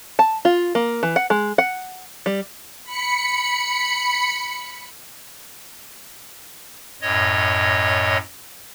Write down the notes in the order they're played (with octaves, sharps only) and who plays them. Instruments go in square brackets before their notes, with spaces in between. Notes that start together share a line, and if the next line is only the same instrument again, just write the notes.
[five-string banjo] A5
F4
A#3
E3
F#5
G#3
F#5
G3
[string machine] B5 C#7
[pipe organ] F#2 A2 C#5 D#5